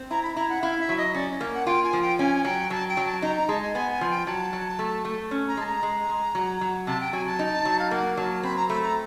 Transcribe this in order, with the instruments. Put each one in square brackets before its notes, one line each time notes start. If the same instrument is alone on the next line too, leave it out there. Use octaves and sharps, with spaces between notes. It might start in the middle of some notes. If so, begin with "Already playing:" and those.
Already playing: [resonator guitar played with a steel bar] C4
[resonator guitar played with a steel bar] E4 [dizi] A#5
[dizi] B5
[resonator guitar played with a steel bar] E4 [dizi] A#5
[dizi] F#5
[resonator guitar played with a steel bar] E4 [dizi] F5
[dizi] E5
[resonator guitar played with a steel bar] F#3
[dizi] D#5
[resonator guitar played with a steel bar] C#4 [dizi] D5
[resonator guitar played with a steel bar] A#3
[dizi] F#5
[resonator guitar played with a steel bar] F4 [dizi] G5
[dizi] G#5
[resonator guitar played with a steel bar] F3
[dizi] G5
[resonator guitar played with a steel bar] C#4 [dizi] G#5
[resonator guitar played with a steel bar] F#3 [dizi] G5
[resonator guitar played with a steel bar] F#3 [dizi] A5
[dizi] G5
[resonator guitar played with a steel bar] F#3
[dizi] A5
[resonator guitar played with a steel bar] D#4 [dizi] A#5
[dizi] A#5
[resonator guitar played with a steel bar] G#3 [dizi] A5
[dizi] G#5
[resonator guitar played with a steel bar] B3 [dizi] G#5
[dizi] G#5
[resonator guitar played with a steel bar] F3
[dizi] G5
[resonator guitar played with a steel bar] F#3 [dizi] A5
[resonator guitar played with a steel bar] F#3
A3
A3
C#4
[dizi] A#5
[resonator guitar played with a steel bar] G#3 [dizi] A5
[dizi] A#5
[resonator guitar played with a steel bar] G#3
G#3
F#3
F#3
[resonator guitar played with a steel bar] C3 [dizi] A5
[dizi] G5
[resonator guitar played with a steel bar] F#3 [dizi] G#5
[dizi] A5
[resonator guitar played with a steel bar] D#4
F#3
[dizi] F5
[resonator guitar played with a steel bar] A#3 [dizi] F#5
[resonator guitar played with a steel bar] F#3 [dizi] A5
[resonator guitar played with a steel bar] C4 [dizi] B5
[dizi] A#5
[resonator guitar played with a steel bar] A3 [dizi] B5
[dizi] A#5